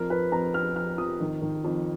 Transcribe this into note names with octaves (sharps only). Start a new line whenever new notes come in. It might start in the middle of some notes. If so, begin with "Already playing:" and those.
Already playing: F2 A#4
F3 B4
F2 A#5
F3 F6
F3 F6
F2 D#6
D#3
D#3
F2